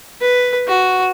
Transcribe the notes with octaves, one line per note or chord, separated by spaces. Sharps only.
B4
F#4